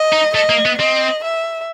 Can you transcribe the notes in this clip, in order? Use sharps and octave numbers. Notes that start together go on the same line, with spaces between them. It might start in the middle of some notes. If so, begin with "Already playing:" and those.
Already playing: D#5
D#4
A3 D#5
A#3
B3
C4 D#5
E5